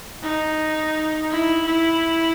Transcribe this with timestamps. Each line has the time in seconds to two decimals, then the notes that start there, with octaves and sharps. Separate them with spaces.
0.23 D#4
1.30 E4
1.66 E4